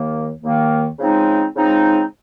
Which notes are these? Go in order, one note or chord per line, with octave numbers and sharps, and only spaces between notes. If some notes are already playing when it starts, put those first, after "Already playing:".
Already playing: D#2 D#3 A#3
D#2 D#3 A#3
C#3 F3 G#3 C4 D#4
C#3 F3 G#3 C4 D#4